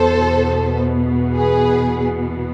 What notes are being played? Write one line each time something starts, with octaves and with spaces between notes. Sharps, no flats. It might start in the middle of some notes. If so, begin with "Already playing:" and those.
Already playing: E2 B2 B3 A4 C5
G#4 B4